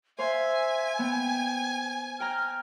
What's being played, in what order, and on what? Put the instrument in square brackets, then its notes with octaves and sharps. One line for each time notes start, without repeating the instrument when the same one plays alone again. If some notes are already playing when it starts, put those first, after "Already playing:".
[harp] C5 F5 C6 [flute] E5 [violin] G#5
[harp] B3 [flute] G5
[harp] G5 A#5 [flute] F6